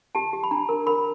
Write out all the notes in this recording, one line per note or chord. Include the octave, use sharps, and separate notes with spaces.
G4 A5
G4
B5
D4 A#5
A#4
A#4 B5